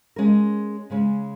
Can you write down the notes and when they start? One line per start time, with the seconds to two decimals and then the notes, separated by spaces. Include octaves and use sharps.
0.16 G#3 C#4 A#4
0.90 C#3 G#3 C#4